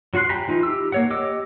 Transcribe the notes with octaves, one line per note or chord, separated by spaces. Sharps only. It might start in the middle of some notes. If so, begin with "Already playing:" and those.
F#3 F#4 F#5 C6 F#6
G4 G5 G#5 A#5 B5
E3 D#4 F4
G4 E6
A#3 C#5 F#5
G4 D#5 D6 E6